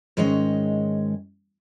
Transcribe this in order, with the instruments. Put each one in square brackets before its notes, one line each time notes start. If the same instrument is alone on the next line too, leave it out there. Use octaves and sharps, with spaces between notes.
[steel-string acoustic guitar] G#2 D#3 G#3 C#4 C#5 D#5